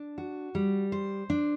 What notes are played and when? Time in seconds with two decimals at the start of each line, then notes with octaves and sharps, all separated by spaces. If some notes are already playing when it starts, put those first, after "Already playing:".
Already playing: D4
0.18 F#4
0.55 G3
0.92 C5
1.30 D4